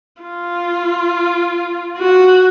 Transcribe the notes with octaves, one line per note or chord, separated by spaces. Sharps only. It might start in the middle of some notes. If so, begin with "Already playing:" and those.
F4
F#4